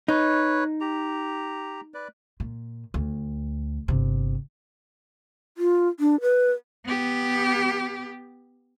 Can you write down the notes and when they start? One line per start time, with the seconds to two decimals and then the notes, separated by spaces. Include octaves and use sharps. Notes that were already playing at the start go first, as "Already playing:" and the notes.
0.08 D#4 B4 C#5
0.81 G4 A#5
1.94 B4 D5
2.40 A#2
2.94 D2
3.88 G1 C3
5.58 F4
6.00 D4
6.21 B4
6.85 B3 G4